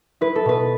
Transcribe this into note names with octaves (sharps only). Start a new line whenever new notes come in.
E4 B4
A4
B2 B4